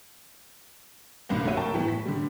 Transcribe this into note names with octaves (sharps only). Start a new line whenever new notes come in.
F#1 B1 G2 C3 D#3
C2 A3 F#4 C#5 E5 D#7
A#4 G5 A5 C#6
A2 E3 G3 B3
B6
D3 G3